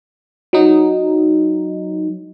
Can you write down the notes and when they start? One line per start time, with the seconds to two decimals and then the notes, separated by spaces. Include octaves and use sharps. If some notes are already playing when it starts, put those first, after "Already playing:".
0.53 F#3 D#4